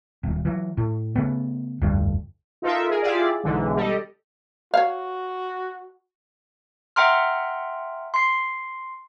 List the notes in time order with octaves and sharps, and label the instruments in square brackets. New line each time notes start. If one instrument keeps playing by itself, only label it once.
[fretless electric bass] D#1
E3 F#3
A2
C#3 A3 B3
F1 D2 G2
[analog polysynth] D#4 F4 A4 A#4 E5
G#4 A#4
E4 F4 G4 G#4 D5
B1 G#2 D3 E3
G3 A4 D#5
[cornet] F#4 [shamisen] C#5 F5
[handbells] E5 F#5 G5 A#5 C6 F6
C6 C7